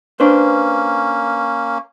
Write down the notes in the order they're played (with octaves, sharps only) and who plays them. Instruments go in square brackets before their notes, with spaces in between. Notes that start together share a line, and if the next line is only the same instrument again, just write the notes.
[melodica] A#3 C#4 [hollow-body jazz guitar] D4 B4 C5